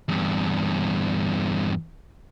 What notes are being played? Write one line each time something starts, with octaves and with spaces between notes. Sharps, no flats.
E2 G2